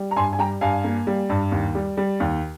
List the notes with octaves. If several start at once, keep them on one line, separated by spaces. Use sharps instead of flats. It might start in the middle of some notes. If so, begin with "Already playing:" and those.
Already playing: G3
A#5
G2 G#5 C6
G#5
G3 G5 A#5
G2 F5 G#5
A#3
G3
G2
D#2
G3
G3
D#2